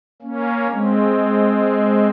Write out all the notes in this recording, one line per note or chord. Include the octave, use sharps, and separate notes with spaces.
A#3 C#4
G#3 C4